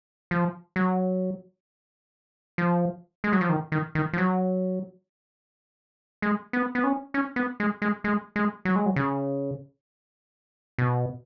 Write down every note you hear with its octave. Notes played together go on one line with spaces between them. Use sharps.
F3
F#3
F3
G#3
F#3
F3
D#3
D#3
D#3
F3
F#3
G#3
B3
B3
C#4
C#4
B3
G#3
G#3
G#3
G#3
F#3
G#3
F#3
C#3
B2